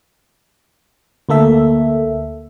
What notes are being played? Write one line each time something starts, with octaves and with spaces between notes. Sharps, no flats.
D2 A#3 A4 E5